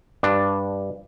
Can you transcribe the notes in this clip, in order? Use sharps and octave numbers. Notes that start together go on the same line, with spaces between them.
G2 D4